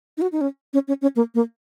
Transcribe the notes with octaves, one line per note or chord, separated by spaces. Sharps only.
D#4
F#4
D#4
C#4
C#4
C#4
C#4
A#3
A#3